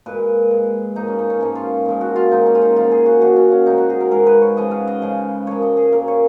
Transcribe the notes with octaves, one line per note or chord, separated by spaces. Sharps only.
A#2 G#3 B4
A#2 G#3
G#2 F3 A#3 D#4
C#4
D#4
C#4
G#2 F3 A#3 D#4
F4
A#2 F3 G#3
F#4
F4
A#2 F3 G#3 D#4
C#4
F4
D#4
C#3 F3 A#3 F4
G#4
F#4
C#3 F3 A#3 F#4
C#4
C#4
G#2 F3 G#3 D#4
F#4
G#4
A#4
G#2 F3 G#3 A#4
B4
C#5
C#3 F3 G#3 D#5
F5
D#5
C#3 F3 G#3
A#2 F3 A#3 C#5
D#5
G#4
A#2 F3 A#3 A#4
C#5